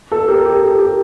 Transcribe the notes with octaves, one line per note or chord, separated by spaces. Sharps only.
A4
G4 A#4
G4
A4
G4 A#4